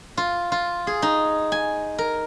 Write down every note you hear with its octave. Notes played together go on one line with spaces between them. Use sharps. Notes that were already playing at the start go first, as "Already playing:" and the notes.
F4
F4
G#4
D#4
G#5
A#4